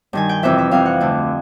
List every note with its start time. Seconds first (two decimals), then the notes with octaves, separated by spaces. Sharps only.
0.13 G2 D#3 G#5
0.29 G5
0.43 F2 C3 E3 E5
0.58 E5
0.71 F2 C3 E3 F5
0.86 F#5
1.00 D2 D3